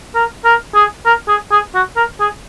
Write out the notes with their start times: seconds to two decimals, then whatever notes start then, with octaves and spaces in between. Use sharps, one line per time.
0.15 A#4
0.45 A#4
0.75 G#4
1.06 A#4
1.28 G#4
1.52 G#4
1.75 F#4
1.97 A#4
2.20 G#4